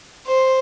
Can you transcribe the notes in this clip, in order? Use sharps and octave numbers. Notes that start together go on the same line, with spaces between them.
C5